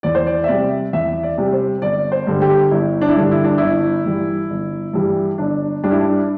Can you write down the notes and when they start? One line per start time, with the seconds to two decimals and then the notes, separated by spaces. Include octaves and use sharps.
0.03 E2 D5
0.15 C5
0.27 D5
0.44 E5
0.48 C3 G3 D5
0.93 E2 E5
1.23 D5
1.38 C3 G3
1.53 C5
1.82 G1 D5
2.12 C5
2.27 G2 D3 G3
2.42 G4
2.71 G1 E4
3.02 D4
3.09 E4
3.16 G2 D3 G3 D4
3.31 E4
3.44 D4
3.58 G1 E4
4.05 G2 E3 G3
4.50 G1
4.93 G2 E3 G3
5.38 G1 D4
5.84 G2 G3 D4
5.91 E4
6.01 D4